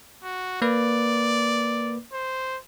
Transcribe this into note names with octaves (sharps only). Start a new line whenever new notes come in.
F#4
A#3 B4 D5
C5